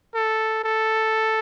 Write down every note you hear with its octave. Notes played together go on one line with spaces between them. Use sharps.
A4
A4